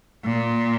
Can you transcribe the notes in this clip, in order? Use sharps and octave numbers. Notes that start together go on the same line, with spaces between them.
A#2